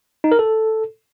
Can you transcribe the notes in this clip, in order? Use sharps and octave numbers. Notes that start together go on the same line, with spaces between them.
D#4
A#4
A4